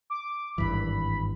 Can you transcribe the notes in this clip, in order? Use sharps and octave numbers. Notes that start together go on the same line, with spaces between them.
D6
G#1 G2 E3 B5